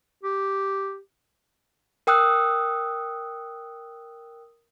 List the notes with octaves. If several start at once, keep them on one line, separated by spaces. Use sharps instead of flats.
G4
A#4 G5 D#6 E6 F#6